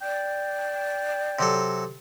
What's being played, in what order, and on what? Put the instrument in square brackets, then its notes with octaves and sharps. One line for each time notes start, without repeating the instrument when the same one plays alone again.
[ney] D5 [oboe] G5
[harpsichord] C3 F#3 A4